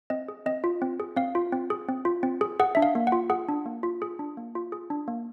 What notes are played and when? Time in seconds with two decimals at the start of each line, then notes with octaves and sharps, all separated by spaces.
0.10 C4 D#5
0.28 G#4
0.46 C4 D#5
0.64 F4
0.82 C4
1.00 G#4
1.16 C4 F5
1.35 F4
1.52 C4
1.70 G#4
1.89 C4
2.05 F4
2.23 C4
2.41 G#4
2.59 G#4 F#5
2.75 D4 E5
2.82 F5
2.95 A#3
3.07 F#5
3.12 F4
3.30 G#4 F#5
3.49 D4
3.66 A#3
3.83 F4
4.02 G#4
4.19 D4
4.37 A#3
4.55 F4
4.72 G#4
4.90 D4
5.08 A#3